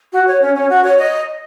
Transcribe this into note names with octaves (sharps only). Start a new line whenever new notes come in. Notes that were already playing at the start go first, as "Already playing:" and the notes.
F#4
C#5
C#4
C#4
F#4
C#5
D#5